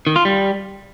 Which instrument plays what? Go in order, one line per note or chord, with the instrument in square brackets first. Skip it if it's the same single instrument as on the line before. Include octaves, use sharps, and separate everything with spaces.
[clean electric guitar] D#3
F4
G3